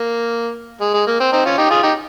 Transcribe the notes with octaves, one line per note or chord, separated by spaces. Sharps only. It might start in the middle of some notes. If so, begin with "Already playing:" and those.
Already playing: A#3
G#3
G#3
A#3
C4
C4 D#4
C#4 F4
D#4 G4
F4 G#4
D#4 G4